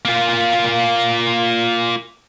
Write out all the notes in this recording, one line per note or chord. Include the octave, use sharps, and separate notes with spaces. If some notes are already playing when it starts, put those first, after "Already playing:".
A#3 F4